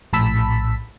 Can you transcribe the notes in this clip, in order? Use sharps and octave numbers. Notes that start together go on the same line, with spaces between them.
A#1 A2 A5 B5 E6 B6